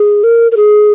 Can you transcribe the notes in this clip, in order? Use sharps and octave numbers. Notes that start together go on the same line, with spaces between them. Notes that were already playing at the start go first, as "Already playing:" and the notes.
Already playing: G#4
A#4
A#4
G#4